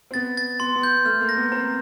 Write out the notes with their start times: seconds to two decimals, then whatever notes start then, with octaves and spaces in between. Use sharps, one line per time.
0.11 C4
0.14 B3 A6
0.37 A6
0.60 B3 C6
0.75 B3
0.83 G6
1.05 A3 F6
1.21 A#3
1.29 A#6
1.37 B3
1.52 C4 A#5